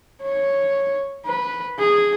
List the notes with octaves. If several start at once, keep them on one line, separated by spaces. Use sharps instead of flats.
C#5
B4
G#4